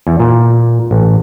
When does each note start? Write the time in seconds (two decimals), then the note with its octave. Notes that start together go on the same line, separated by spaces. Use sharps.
0.07 E2
0.19 A#2
0.91 A1